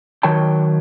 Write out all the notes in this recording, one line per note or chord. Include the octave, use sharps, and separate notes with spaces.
D#3 F#3 C#5 G5 A5